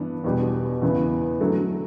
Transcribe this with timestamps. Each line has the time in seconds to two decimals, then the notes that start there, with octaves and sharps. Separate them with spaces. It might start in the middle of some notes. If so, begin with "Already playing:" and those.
Already playing: G2 E3 B3 D4
0.24 E2 B2 G3 D4 G4
0.82 E2 C#3 E3 B3 E4
1.41 D3 F#3 A3